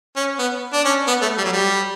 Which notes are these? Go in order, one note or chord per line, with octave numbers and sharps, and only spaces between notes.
C#4
B3
D4
C#4
B3
A3
G3
F#3
G3